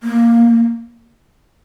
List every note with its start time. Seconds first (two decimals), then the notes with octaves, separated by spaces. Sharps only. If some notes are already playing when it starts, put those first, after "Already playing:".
0.03 A#3